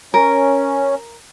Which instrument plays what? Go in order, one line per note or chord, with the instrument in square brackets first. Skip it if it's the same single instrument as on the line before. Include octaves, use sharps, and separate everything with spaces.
[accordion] C#4 [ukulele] A#4